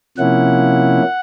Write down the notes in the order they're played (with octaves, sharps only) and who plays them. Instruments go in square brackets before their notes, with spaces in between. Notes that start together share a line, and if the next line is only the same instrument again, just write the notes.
[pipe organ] C3 F3 A#3 C#4 E4 F#5